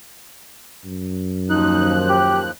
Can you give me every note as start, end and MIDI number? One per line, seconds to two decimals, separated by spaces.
0.85 2.46 42
1.49 2.51 39
1.49 2.51 53
1.49 1.99 63
1.49 2.51 90
2.09 2.39 67